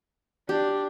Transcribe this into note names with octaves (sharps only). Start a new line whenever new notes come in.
D4 G4